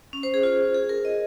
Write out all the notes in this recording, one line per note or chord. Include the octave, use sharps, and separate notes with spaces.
C#4
C5
G#4
F4
G#4
A#4
D#5